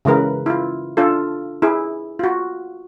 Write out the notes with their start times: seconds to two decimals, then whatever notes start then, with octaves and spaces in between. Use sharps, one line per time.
0.05 C#3 E3 G#3 A#4 B4
0.46 E4 F4
0.97 D4 F4 A4
1.62 E4 G#4
2.19 F4 F#4